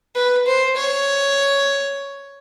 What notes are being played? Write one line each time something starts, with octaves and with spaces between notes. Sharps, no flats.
B4
C5
C#5